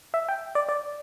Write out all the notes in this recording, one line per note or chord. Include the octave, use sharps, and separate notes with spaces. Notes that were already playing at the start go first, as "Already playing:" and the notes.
E5
G5
D5
D5